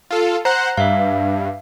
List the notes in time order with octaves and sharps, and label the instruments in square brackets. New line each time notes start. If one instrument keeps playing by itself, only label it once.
[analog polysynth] F4 A4
[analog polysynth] C5 F#5 [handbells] A#5 F#6
[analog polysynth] G2 [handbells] E5 F5